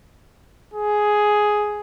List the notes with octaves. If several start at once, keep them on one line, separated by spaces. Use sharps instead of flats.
G#4